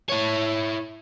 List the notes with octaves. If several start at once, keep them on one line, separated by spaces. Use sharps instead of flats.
E4 C#5